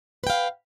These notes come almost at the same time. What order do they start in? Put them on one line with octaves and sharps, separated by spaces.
B4 G5 F5